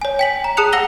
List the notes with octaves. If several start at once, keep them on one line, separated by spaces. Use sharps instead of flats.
C#5 G#5
G5 B6 F#7
A#5
G#4 A5 D#6 F#6 C#7 F7
F#5 E6 A#6 F7 G7